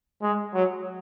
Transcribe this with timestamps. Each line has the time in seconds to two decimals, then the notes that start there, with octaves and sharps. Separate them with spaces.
0.22 G#3
0.54 F#3